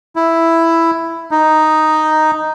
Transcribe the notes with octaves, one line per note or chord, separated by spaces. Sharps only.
E4
D#4